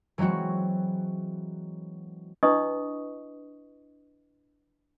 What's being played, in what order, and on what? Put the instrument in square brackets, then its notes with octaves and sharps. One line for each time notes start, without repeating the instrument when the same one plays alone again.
[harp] E3 F#3 G#3 C4 F#4
[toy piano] D4 E4 B4 D#5 C#6 D#6